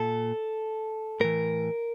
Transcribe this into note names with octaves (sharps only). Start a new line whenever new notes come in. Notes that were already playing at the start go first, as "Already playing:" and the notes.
Already playing: A#2 A4
A2 E3 A#4